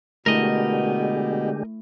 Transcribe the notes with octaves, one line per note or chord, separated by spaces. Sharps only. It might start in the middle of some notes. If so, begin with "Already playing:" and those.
B2 D3 G#3 A3 E4 G4 A#4 D#5